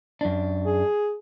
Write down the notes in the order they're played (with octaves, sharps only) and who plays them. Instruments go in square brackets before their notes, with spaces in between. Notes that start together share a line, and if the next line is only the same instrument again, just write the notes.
[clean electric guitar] F#2 D4
[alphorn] G#4